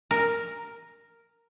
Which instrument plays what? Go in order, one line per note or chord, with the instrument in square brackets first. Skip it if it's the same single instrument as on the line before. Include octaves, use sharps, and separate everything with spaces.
[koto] A#4